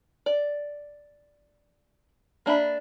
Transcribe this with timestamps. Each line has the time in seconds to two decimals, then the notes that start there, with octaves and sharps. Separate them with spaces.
0.26 D5
2.46 A#3 D4 E5 B5